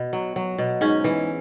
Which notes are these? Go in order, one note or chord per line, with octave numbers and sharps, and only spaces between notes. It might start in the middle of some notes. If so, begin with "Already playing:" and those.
Already playing: B2
F#3
F#3
B2
G#2 C#4
E3